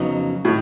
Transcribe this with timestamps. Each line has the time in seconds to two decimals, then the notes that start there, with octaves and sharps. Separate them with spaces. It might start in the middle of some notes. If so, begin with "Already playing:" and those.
Already playing: F2 C#3 F#3 B3 D#4
0.45 A2 D#3